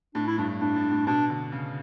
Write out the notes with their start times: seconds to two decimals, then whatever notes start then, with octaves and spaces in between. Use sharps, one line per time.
0.14 A2 D4
0.27 E4
0.38 G2 D4
0.61 A2 D4
0.76 A2
0.91 A2
1.07 B2 D4
1.30 D3
1.52 C#3